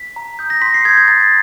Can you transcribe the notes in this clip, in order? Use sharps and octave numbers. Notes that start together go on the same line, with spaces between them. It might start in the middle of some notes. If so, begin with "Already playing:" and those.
Already playing: B6
A#5
D#6 G6
A#6
C6 B6
C7
D#6 G6 G#6
G#6
A#5 A6